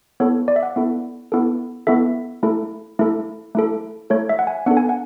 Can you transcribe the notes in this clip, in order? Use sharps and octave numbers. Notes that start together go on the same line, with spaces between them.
B3 E4 A4 C#5
D5
E5
F#5
B3 E4 A4
B3 E4 A4
B3 E4 A4 E5
A3 E4 A4
A3 E4 A4
A3 E4 A4
A3 E4 A4 C#5
E5
F#5
G#5
B3 D4 A4 F#5
G#5
F#5